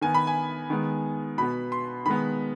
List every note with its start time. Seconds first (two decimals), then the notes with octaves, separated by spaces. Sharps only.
0.01 D#3 B3 G#5
0.15 B5
0.27 G#5
0.70 D#3 G#3 B3
1.38 B2 B3 B5
1.72 C6
2.06 D#3 G#3 B3 B5